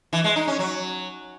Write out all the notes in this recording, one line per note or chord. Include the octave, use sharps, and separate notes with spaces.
E3
G#3
D#4
C#4
F#3